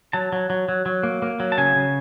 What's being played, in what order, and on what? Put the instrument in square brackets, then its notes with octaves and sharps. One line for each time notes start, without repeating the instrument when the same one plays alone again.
[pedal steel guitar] F#3 A5
F#3
F#3
F#3
F#3
A#3
A#3
F#3
A5
C#3 G#5
C#3